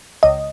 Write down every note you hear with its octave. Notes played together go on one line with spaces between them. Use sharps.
C#2 D#5